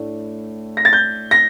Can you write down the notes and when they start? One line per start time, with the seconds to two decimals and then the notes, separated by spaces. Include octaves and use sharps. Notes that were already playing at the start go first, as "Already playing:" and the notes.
Already playing: A2 A3 D4
0.77 A#6
0.85 A6
0.93 G6
1.31 A#6